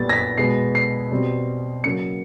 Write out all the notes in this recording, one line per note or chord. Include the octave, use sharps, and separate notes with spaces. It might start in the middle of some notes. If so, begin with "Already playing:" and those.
Already playing: A#2 G3 B3 A6
A#6
B6
B2 G#3 B3 C7
C7
B2 G3 C4
C#3 F#3 A#3 C#7